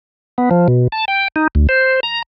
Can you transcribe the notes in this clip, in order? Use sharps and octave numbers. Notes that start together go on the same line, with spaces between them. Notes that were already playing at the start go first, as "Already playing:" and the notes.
B3
F3
B2
A5
G5
D#4
D2
C5
A#5